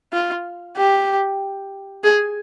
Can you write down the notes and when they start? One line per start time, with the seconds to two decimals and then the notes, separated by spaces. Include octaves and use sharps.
0.13 F4
0.77 G4
2.04 G#4